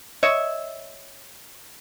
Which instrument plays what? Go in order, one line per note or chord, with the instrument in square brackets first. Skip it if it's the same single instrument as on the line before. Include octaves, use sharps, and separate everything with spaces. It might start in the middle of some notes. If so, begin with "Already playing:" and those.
[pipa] C#5 D#5 E5